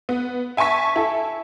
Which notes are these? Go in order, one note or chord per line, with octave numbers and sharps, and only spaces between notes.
B3
E5 G#5 A5 C#6 B6
E4 A4